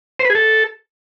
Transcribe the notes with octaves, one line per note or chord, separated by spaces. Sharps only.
C5
B4
G#4
A4